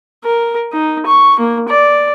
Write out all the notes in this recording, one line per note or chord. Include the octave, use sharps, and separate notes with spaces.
A#4
D#4
C#6
A#3
D5